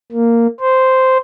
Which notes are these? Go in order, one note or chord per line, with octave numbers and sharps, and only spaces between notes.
A#3
C5